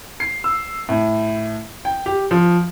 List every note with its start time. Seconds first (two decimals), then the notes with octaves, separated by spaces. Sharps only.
0.20 C7
0.44 E6
0.89 A2
1.85 G5
2.06 G4
2.31 F3